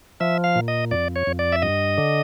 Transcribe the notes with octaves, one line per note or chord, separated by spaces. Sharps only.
F3 E5
F5
A#2
D#5
F2 D5
C#5
F2
D5
E5
G2 D#5
D3